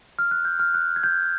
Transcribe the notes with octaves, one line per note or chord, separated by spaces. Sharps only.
F6
F#6
G6
F6
F#6
G#6
G6